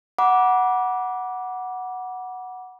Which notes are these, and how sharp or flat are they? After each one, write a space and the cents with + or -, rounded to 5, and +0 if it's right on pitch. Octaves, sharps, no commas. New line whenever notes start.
F#5 +0 B5 -40 D6 -5